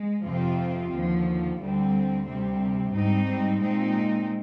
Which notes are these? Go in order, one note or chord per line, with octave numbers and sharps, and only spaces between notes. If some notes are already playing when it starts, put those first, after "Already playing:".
Already playing: G#3
F2 C3 F3 C4 F4
D#2 D3 F3
D2 D3 G3 C4
D2 C3 G3 C4
G#2 G3 C4 D#4
A#2 G#3 C4 D#4